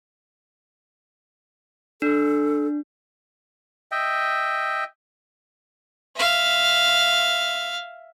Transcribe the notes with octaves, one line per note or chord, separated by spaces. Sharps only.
D4 A4
D#5 E5 G5
E5 F5